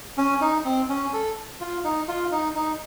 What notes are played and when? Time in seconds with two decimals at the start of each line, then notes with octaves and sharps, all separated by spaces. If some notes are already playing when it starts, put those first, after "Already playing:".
0.18 C#4
0.41 D#4
0.65 C4
0.89 C#4
1.13 A4
1.60 F4
1.84 D#4
2.08 F4
2.32 D#4
2.55 D#4